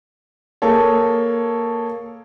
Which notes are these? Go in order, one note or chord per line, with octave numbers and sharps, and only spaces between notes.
A#3 G#4 A4 C#5